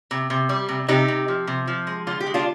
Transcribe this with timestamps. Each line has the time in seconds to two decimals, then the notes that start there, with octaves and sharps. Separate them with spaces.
0.11 C3
0.30 C3
0.49 G3
0.69 C3
0.88 C3 D#4 G4
1.08 C3
1.28 F3
1.47 C3
1.67 F3
1.87 G#3
2.07 D3 F4
2.21 G4
2.26 G#3
2.34 D4 F4